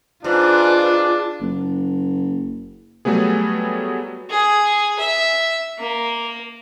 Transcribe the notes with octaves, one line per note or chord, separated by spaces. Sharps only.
G#2 D4 F4 B4
F#1
F#3 G3 A3 B3 G#4
G#4
E5
A#3